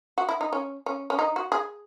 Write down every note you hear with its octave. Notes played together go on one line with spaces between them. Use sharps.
F#4
E4
D#4
C#4
C#4
C#4
D#4
F#4
G#4